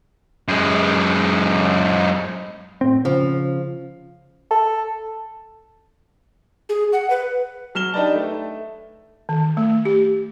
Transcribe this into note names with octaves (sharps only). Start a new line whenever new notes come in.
F#2 G#3
A2 C4
C#3 F3
A4
G#4
F#5
B4
F#3 F6 E7 G7
D4 D#4 G4 B4 D5 A5
A3
D#3
A3
G4